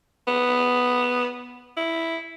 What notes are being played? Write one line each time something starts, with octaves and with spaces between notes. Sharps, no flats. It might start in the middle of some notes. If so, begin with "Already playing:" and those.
B3
E4